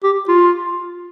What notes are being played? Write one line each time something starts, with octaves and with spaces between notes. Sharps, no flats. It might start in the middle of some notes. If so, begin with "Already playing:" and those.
G4
F4